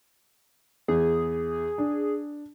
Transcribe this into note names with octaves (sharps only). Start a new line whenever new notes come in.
E2 G#4
D4